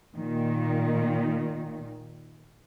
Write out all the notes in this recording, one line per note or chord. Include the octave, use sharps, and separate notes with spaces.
A#2 D#3